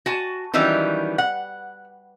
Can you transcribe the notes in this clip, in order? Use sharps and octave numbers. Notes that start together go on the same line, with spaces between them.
F#4 G#5 A5
D#3 E3 F#3 G3 C#4
F#5